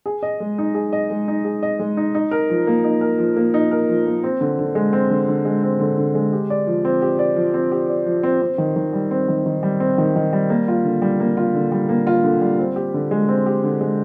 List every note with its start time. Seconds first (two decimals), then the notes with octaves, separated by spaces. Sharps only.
0.06 G#4
0.23 D#5
0.40 G#3
0.58 D#4
0.75 G#4
0.93 D#5
1.10 G#3
1.28 D#4
1.45 G#4
1.63 D#5
1.79 G#3
1.97 D#4
2.15 D#4
2.31 A#4
2.50 F3
2.67 A#3
2.84 D#4
3.01 A#4
3.18 F3
3.36 A#3
3.54 D#4
3.71 A#4
3.89 F3
4.06 A#3
4.24 C4
4.41 D3
4.59 D3
4.75 G#3
4.93 C4
5.10 D3
5.28 D3
5.45 G#3
5.63 C4
5.80 D3
5.97 D3
6.15 G#3
6.33 G4
6.50 D5
6.67 F3
6.85 C4
7.02 G4
7.19 D5
7.36 F3
7.54 C4
7.72 G4
7.89 D5
8.06 F3
8.23 C4
8.41 C4
8.58 D#3
8.76 D#3
8.93 G3
9.11 C4
9.28 D#3
9.46 D#3
9.63 G3
9.80 C4
9.98 D#3
10.16 D#3
10.33 G3
10.50 A#3
10.68 F4
10.85 D3
11.02 G3
11.20 A#3
11.37 F4
11.54 D3
11.72 G3
11.89 A#3
12.07 F4
12.24 D3
12.41 G3
12.59 C4
12.76 G4
12.94 D3
13.11 G#3
13.28 C4
13.46 G4
13.64 D3
13.81 G#3